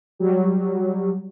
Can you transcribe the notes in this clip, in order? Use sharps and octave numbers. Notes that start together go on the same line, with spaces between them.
F#3 G3